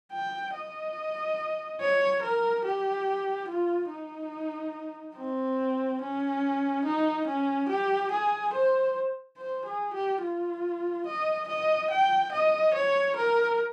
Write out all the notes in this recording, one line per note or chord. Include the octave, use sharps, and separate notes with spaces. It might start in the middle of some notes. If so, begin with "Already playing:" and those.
G5
D#5
C#5
A#4
G4
F4
D#4
C4
C#4
D#4
C#4
G4
G#4
C5
C5
G#4
G4
F4
D#5
D#5
G5
D#5
C#5
A#4